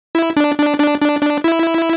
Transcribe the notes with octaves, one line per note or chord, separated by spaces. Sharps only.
E4
D4
D4
D4
D4
D4
E4